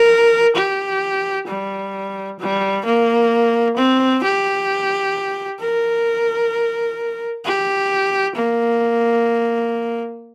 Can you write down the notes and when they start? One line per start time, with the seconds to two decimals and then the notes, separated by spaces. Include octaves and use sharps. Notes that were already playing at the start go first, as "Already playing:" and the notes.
Already playing: A#4
0.56 G4
1.47 G3
2.40 G3
2.85 A#3
3.77 C4
4.24 G4
5.60 A#4
7.45 G4
8.36 A#3